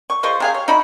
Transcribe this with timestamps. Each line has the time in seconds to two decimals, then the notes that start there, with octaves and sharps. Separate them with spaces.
0.10 C#6
0.23 G#3 F4 C5 C#6
0.40 C3 G#4 F5
0.54 C#5
0.68 D#4 E4 F#4 B5